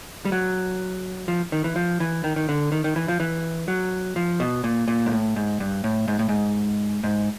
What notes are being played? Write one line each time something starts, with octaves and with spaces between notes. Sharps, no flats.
G3
F#3
F3
D#3
E3
F3
E3
D#3
D#3
D3
D#3
D#3
E3
F3
E3
F#3
F3
B2
A#2
A#2
G#2
A2
G#2
G2
A2
G#2
A2
G#2
G#2